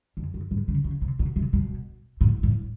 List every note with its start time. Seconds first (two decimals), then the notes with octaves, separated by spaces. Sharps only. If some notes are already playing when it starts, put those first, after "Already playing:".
0.17 F2
0.34 F#2
0.51 G#2
0.68 C#3
0.84 C#3
1.02 C3
1.19 B2
1.36 C3
1.53 B2
2.21 A2
2.43 A2